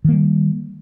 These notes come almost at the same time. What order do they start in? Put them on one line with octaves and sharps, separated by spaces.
D#3 A#3 G3